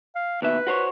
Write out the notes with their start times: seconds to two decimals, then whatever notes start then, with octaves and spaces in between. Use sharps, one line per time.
0.15 F5
0.42 D#2 B2 B4 E5
0.67 F#4 C5 C#5